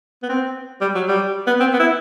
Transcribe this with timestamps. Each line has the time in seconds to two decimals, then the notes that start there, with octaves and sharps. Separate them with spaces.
0.23 B3
0.29 C4
0.81 G3
0.95 F#3
1.08 G3
1.47 B3
1.60 C4
1.73 B3
1.80 E4